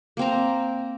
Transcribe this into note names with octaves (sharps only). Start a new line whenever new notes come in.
A#3 C4 A#5